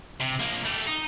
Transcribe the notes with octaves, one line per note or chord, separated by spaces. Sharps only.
C3
F3 A#3
A3 G4
D#4